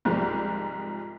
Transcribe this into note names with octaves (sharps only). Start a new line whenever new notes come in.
C2 G#2 F3 G3